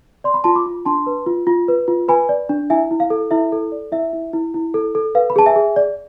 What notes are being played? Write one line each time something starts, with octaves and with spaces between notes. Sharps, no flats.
D5 C6
B5
F4 A5 C6
B5 D6
F4
D4 A5 C6
B4
F4
F4
B4
F4
B4 G#5 B5
D5
D4
E4 E5 G#5
E4
F5
A4
E4 E5
A4
D5
E4 E5
E4
E4
E4
A4
A4
B4 F5
B5
G#4 A5
E5 G#5
G#4
D5